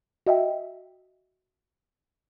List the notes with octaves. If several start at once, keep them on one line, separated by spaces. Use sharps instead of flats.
F#4 D#5 E5 G5